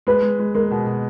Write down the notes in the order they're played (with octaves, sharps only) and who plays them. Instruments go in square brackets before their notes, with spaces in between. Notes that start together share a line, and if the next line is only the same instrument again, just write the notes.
[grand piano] G#3 [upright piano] B4
[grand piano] G#3
G#3
[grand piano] G#3 [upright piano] A#4
[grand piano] B2
B2